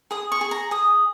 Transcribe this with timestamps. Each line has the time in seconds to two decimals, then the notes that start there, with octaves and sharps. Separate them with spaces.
0.11 G#4 D#6
0.32 C#6
0.41 G#4
0.51 A#5
0.71 G#4 D#6